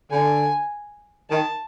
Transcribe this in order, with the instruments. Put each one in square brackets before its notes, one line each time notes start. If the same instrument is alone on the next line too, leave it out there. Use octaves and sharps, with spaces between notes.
[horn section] D3 [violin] G#5
[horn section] D#3 [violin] A5